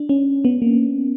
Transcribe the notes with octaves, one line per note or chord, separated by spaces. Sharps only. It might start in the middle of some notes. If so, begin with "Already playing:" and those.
Already playing: D4
C#4
B3
A#3